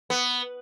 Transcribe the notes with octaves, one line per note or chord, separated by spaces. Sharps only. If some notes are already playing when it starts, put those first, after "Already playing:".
B3